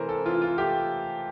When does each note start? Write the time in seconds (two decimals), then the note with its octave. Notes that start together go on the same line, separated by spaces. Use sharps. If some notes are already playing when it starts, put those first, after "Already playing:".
Already playing: C3 E3 A3 A#4 C5
0.09 A4
0.25 E3 F4
0.42 F4
0.58 A3 G4